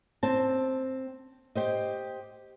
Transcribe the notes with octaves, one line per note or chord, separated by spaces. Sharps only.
C4 A5
G4 C5 D#5